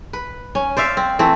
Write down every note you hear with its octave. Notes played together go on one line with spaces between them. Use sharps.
B4
C#4
C5 D5 E5 F5
C4
E3 A3 C4